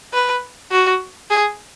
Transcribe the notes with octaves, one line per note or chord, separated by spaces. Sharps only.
B4
F#4
G#4